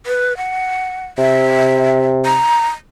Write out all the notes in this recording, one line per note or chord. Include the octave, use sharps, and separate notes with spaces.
B4
F#5
C3 E5
A#5